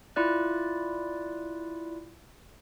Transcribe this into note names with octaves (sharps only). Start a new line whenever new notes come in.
E4 F4 D5 F#6